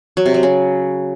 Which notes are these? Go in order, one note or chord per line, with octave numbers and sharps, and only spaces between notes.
F#3
C3
F#3
C#3